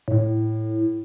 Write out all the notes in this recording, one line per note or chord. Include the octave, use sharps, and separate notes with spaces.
A2